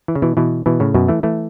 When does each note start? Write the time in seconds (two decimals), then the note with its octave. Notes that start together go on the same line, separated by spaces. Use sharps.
0.08 E3
0.15 C#3
0.22 B2 E3
0.37 B2 E3
0.66 B2 E3
0.80 A2 C#3
0.94 F#2 B2
1.08 E3 A3
1.23 E3 A3